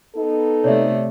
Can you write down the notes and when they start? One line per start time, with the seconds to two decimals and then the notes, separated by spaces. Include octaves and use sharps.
0.16 B3 D#4 A4
0.64 C3 A3 C#5 D5 E5